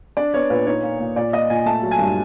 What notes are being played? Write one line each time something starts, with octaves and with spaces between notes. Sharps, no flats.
D4 D5
B3 C#5
A#2 B4
D#4 C#5
A#3
A#2
A#2 D5
A#3 D#5
A#2 G#5
A3 A5
F#3
G#5
G2